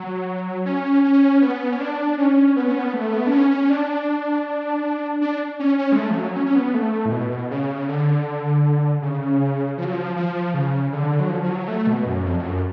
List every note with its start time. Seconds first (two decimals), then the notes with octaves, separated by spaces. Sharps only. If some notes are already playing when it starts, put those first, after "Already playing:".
Already playing: F#3
0.65 C#4
1.04 C#4
1.42 B3
1.72 C#4
1.80 D4
2.18 C#4
2.56 B3
2.67 C#4
2.79 B3
2.93 A3
3.12 B3
3.27 D4
3.31 C#4
3.51 C#4
3.70 D4
5.21 D4
5.60 C#4
5.78 C#4
5.92 G#3
5.98 A3
6.10 F3
6.17 F#3
6.36 C#4
6.46 C#4
6.55 B3
6.74 A3
7.05 A2
7.12 B2
7.51 C#3
7.88 D3
9.02 C#3
9.78 F3
9.85 F#3
9.92 F3
10.16 F3
10.54 C#3
10.92 D3
11.20 F#3
11.30 F3
11.43 F3
11.49 F#3
11.68 A3
11.87 B2
12.06 F#2
12.25 F2
12.39 F2
12.44 F#2